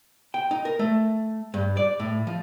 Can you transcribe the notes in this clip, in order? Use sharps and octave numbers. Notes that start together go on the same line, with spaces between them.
G5
D#4
A#4
A3
G2
D5
A2
F3